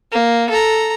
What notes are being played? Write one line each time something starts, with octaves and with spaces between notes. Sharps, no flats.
A#3
A4 A#5